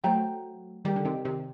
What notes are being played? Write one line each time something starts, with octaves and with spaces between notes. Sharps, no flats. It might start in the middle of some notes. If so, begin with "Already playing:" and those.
F#3 A3 F#4 C5 G5 A#5
D#3 G3 G4 A#4 D5
D3
C3 D#3
C3 D#3